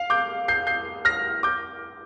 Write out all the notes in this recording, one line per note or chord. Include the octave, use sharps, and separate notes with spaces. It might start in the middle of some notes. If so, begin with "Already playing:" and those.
Already playing: F5
D6 G6
G6 C7
G6 C7
F6 A#6
D6 G6